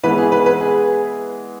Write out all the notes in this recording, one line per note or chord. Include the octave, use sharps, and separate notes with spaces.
E3 G#3 B3 B4
G#4
B4
B4
G#4